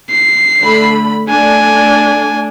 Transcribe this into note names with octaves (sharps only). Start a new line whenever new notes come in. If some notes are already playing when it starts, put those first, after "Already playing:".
C7
D3 A3 B5
A3 D4 G#5